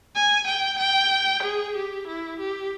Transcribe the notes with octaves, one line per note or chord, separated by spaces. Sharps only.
G#5
G5
G5
G#4
G4
E4
G4